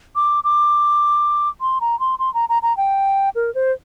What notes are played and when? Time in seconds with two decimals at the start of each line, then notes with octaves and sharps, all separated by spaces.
0.16 D6
0.44 D6
1.61 C6
1.81 A#5
2.00 C6
2.19 C6
2.34 A#5
2.49 A#5
2.62 A#5
2.77 G5
3.35 A#4
3.55 C5